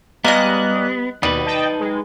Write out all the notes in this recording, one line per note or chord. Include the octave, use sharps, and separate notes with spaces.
G3 G#3 A#3 B3 D#5 F#6
D#2 B2 G3 D#4 B4
D#5 G5 A5
G#3